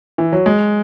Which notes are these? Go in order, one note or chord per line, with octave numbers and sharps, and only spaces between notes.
E3
F#3
G#3